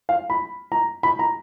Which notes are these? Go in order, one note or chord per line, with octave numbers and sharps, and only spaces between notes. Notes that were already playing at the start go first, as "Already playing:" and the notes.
F5
B5
A#5
B5
A#5